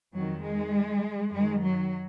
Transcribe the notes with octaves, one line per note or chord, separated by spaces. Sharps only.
F2 D#3 F#3
G#3
F#2 D#3 G#3
F#3